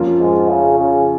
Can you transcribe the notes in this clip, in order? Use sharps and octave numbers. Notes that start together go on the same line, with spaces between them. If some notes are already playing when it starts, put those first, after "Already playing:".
Already playing: F2 F3 A#3 C#4 F4
G#2
C#3
C#3